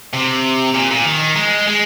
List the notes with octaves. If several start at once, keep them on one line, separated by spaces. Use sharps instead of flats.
C3
A#2
A#2
D#3
G#3
G#3